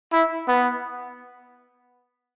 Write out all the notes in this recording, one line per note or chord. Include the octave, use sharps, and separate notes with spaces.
E4
B3